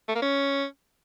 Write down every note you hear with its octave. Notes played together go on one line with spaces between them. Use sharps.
A3
A#3
C#4